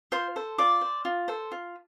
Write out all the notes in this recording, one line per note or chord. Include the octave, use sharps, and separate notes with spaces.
F4 C5 C6
A4 C5
F4 D5 D6
C5
F4
A4 C5
F4